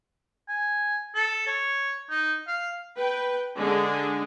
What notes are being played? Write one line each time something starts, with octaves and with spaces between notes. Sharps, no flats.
G#5
A4
C#5
D#4
F5
B4 G5
D3 G#3 D4 G#4